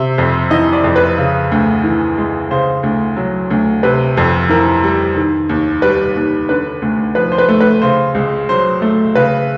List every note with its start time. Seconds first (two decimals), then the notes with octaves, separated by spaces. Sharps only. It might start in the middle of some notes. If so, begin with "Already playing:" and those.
Already playing: C3 E5
0.18 F2
0.51 E3 D#5
0.73 D5
0.84 F2
0.96 B4
1.18 C#3
1.52 D2
1.84 E3
2.18 G#3
2.51 C#3 C5
2.83 D2
3.17 F#3
3.50 D2
3.83 C3 B4
4.17 F2
4.49 E3 A#4
4.84 G3
5.16 D#3
5.49 D#2
5.82 G3 B4
6.16 D#2
6.49 D3 B4
6.82 D2
7.15 F3 B4
7.32 C5
7.38 B4
7.48 A3
7.61 B4
7.82 C#3 C5
8.15 C#2
8.49 F#3 C5
8.82 A3
9.15 C#3 B4